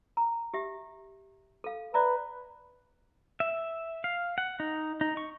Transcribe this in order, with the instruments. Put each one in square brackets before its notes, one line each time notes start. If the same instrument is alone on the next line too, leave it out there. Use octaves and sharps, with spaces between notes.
[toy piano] A#5
G4 E5
A4 F5
[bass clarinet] B4 [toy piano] D5 E5 A#5
[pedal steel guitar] E5
F5
F#5
D#4
D#4
C#6